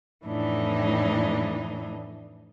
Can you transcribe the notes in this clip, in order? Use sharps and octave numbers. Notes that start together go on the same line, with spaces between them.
F2 A2 E3 D4 D#4